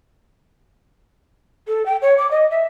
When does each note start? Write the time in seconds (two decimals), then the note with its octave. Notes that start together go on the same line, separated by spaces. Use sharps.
1.67 A4
1.86 G5
2.02 C#5
2.18 D6
2.31 D#5
2.50 E5